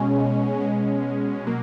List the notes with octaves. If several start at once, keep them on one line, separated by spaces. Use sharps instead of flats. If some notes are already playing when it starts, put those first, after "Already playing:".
Already playing: B2 G#3 C#4
B2 G#3 C#4
B2 F#3 A#3